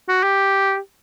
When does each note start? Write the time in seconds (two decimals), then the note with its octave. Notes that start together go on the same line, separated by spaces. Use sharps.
0.09 F#4
0.23 G4